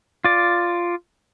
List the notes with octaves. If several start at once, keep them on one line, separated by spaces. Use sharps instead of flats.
F4 D5